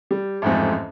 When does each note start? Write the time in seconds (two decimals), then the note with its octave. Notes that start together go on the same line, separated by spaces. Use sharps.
0.11 G3
0.42 A1 F2 G#2